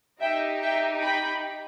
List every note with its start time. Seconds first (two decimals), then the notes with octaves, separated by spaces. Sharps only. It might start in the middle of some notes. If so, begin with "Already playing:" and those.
0.21 D#4 G4 E5 G5
0.62 E5 G5
1.03 G5 B5